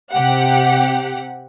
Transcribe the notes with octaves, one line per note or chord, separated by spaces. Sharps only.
C3 G4 F#5